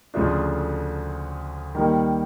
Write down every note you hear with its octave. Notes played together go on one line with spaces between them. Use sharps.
D2 C#3 F3 A3 D4
D#3 G3 A#3